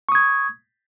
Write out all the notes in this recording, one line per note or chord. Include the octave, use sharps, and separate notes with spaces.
C#6 D#6 G#6